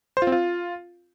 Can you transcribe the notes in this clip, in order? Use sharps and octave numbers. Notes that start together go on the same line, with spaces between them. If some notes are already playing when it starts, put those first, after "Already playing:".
C5
F4
C4
F4